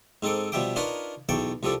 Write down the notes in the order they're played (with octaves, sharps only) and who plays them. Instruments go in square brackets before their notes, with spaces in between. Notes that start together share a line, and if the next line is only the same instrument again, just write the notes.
[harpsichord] G#2 C4 D#4 A4 D6
B2 F3 G3 E5 G5 D6
D4 D#4 F4 A#4 B4 C#5
B1 E2 G5 A5 C#6 D6
C2 F3 G3 A4 D5